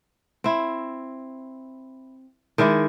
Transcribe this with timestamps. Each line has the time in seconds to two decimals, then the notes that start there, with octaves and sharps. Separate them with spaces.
0.44 C4 E4
2.58 D#3 G#3 E4 D5